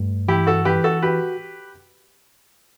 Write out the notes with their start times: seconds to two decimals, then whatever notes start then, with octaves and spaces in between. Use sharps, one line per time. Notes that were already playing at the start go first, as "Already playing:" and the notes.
Already playing: G2 A3
0.28 E3 E4 G4
0.47 F#4 A4
0.65 E3 G4 B4
0.84 F#4 A4
1.02 F#4 G4 B4